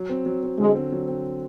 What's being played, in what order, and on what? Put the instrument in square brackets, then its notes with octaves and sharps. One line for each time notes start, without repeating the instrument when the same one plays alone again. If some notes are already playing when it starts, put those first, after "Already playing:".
Already playing: [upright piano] F#3
C4
F#3
C4
[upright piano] D3 [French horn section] G#3
[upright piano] C4
F#3
C4